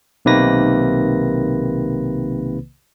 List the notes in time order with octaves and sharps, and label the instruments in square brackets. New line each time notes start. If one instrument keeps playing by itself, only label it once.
[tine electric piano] B1 C3 D#3 A#3 B4 A#6